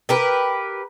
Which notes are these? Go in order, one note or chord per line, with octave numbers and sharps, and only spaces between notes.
G4 A#4 B4